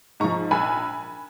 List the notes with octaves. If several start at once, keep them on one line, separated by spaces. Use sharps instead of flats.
G#2 F3 A#5 C#6
A#1 G#5 B5